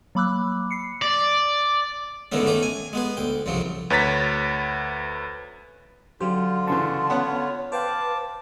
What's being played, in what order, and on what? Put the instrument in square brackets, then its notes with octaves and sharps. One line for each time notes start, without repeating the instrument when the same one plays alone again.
[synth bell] F#3 A#3 B5 D6 E6 F#6
C7 C#7
[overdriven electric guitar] D5
[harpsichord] G#2 D3 D#3 A3 B3 C#4
D#3 A3 C#4 D6
G#5
G#3 B3 G#4
D2 G5
C2 F#2 C#3 F3 F#3
[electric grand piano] D2 B4 C#5 A#5 A6 B6
[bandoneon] D3 F4 [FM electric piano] F#3 C5 [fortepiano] G4
[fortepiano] G2 C#3 E3 [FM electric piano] A5 C#6 [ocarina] C6
[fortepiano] B3 C#4 F#5 [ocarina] C#5
[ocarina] B4 [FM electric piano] C5 F5 G5 [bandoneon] A5 D6